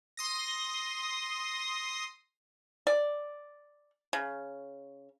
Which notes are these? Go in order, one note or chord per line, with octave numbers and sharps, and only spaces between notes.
C6 D#6 A#6
D5
C#3